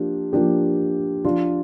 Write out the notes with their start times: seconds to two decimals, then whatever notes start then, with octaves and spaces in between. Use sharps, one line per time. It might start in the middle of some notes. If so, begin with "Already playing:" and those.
Already playing: F3 A#3 D4 G4
0.33 F3 A#3 D4 G4
1.25 F3 D4 F4